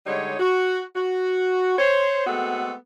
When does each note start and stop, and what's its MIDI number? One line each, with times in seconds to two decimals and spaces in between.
0.07 0.35 50
0.07 0.35 55
0.07 0.35 56
0.07 0.35 63
0.07 0.35 73
0.40 0.83 66
0.96 1.76 66
1.78 2.24 72
1.78 2.24 73
2.27 2.73 56
2.27 2.73 57
2.27 2.73 59
2.27 2.73 60
2.27 2.73 66
2.27 2.73 69